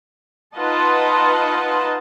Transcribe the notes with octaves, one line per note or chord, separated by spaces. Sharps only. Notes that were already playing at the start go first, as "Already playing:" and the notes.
D#4 F4 B4 D#5 F#5 A5